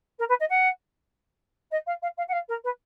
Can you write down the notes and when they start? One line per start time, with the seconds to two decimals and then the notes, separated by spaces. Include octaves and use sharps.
0.19 A#4
0.29 B4
0.40 D#5
0.49 F#5
1.71 D#5
1.86 F5
2.02 F5
2.17 F5
2.28 F#5
2.32 F5
2.48 A#4
2.64 B4